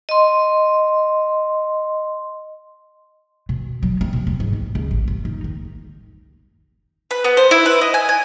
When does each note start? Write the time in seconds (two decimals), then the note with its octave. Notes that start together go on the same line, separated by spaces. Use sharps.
0.09 D#5 C6
3.49 B2
3.83 F#3
4.01 C4
4.13 B2
4.27 B3
4.40 G#2
4.53 B1
4.75 C#2
4.91 A1
5.08 F2
5.25 D#4
5.44 D#3
7.11 B4
7.24 B3
7.37 C5
7.51 E4
7.66 B4
7.81 D#5
7.94 G#5
8.09 G#5